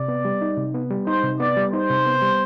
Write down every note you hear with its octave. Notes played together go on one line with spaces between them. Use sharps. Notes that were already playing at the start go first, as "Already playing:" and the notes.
Already playing: C3 D5
B3
G3
D#4
C3
B3
G3
D#4 C5
C3
B3 D5
G3
D#4 C5
C3
B3
G3